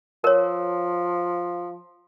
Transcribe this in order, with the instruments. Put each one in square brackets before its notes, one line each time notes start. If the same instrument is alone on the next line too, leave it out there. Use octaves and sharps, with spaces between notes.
[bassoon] F3 [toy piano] A#4 C#5